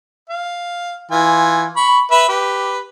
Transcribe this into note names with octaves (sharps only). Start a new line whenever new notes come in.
F5
E3 F4 G#5
B5 C#6
B4 E5 B5
G4 B4